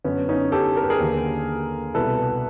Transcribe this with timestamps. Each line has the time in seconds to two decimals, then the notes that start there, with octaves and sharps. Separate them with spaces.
0.04 F#2 D3 B3 C#4
0.29 C#4 D#4
0.52 G4 A4
0.76 A#4
0.83 B4
0.90 G#4 A#4
1.00 D#2 D3
1.94 C2 B2 A4 B4